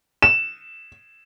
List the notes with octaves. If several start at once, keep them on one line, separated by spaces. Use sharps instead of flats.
E7